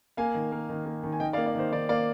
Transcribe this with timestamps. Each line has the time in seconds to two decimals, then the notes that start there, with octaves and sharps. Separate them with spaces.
0.17 A#3 F5 G#5
0.34 D#3
0.52 A#3
0.69 D#3
0.86 A#3
1.03 D#3
1.12 G#5
1.20 D#3 D#5 G5
1.33 D5 F5
1.37 A#3
1.46 D5
1.55 D#3 C5
1.72 D#3 D5
1.89 A#3 D5 F5